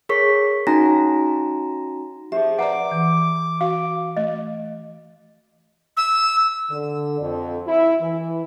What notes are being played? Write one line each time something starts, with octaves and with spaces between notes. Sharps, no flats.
G#4 A#4 C#5 C#6 B6
C#4 D#4 F#4 G#5 A#5 A#6
F3 G4 G#4 E5
B4 D5 F#5 A#5 D6
E3
F#4 F5
A3 D#5
E6
D3
F2
E4
E3